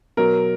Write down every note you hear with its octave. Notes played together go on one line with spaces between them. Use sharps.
B2 F#3 A#4